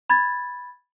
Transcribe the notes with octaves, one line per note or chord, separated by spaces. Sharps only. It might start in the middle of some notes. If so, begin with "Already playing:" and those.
B5 G#6 A6